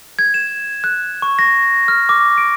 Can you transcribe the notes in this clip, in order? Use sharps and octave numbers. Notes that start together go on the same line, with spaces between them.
G#6
E7
F#6
C#6
A#6
F6
D6
D7